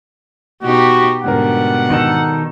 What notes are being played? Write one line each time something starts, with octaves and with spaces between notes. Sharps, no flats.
B2 D#4 F#4 G4
G#2 B2 D3 G3 A#4 F#5
D#3 D#4 A4